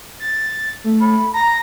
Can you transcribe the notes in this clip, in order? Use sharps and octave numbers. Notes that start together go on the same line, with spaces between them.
A6
A3
B5
A#5 A#6